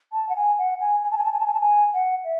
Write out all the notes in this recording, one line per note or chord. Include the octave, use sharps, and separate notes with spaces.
A5
F#5
G#5
F#5
G#5
G#5
A5
G#5
A5
G#5
A5
G#5
A5
G#5
F#5
E5